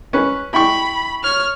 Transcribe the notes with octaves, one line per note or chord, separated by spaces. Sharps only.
C#4 B4
E4 G5 B5 C#6
C#5 F6